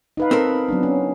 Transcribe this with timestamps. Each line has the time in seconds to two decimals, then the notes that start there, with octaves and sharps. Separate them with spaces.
0.17 D#4 B4 F5
0.31 C4 A4 A#4
0.69 F#3 B3 D4
0.83 C#4